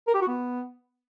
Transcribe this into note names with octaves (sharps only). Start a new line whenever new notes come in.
A#4
G4
F#4
B3